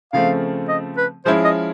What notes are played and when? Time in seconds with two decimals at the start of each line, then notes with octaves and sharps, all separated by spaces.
0.13 C#3 F3 A3 C4 F5
0.69 D#5
0.97 B4
1.25 F3 G#3 C#4 E4 C5
1.44 D#5